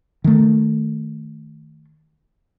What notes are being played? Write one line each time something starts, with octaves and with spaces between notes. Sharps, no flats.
D#3 A3